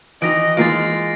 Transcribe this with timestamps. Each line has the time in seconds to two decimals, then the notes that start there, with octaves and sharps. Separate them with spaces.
0.22 D#3 E3 D#5 D#6 A#6 D7
0.57 E3 G#3 A#3 F4 A6 C7 D7